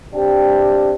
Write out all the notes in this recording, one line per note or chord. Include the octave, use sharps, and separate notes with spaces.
C3 D4 G4